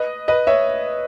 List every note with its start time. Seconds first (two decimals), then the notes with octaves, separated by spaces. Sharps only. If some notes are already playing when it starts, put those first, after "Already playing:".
Already playing: B4 D#5
0.28 B4 D#5
0.47 C#5 E5